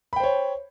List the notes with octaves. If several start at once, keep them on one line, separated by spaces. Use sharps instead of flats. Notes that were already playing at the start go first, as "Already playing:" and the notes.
C5 C#5 G5 B5